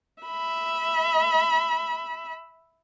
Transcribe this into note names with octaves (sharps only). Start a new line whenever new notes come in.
E5 B5